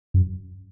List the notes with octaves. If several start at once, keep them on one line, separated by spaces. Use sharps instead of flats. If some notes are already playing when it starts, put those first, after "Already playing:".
F#2